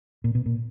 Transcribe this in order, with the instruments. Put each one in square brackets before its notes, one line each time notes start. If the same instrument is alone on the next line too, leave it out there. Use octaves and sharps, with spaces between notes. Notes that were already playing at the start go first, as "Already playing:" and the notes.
[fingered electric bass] A#2
B2
A#2